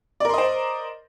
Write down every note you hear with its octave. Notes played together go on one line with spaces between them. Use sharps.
A#4 C5 D5 D#5 C6